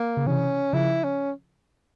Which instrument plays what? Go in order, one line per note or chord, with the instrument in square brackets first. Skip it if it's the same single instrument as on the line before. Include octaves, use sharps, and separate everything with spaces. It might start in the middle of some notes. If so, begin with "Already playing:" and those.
Already playing: [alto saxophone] A#3
[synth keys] C#3
[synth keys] C3 E3 [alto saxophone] C#4
[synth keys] C#3 F3 [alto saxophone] E4
[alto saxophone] C#4